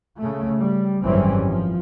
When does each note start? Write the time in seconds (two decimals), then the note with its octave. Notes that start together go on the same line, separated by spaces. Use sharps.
0.17 C#3 A3
0.61 G3
1.04 G#1 F#2 E3 G3 C4 C#4
1.47 F3